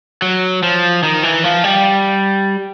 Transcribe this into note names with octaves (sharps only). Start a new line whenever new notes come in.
F#3
F3
D#3
E3
F3
G3